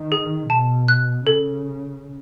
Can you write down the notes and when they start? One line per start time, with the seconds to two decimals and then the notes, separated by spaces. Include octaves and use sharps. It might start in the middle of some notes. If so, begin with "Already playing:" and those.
Already playing: D#3
0.12 G#4
0.50 B2 A5
0.88 F#6
1.26 C#3 A4